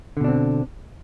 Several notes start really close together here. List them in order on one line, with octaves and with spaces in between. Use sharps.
D3 B2 D4 C4